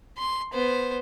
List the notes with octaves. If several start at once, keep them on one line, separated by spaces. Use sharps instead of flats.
C6
B3 C5